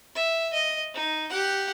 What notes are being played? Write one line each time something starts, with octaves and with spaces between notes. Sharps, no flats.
E5
D#5
D#4
G4 F#5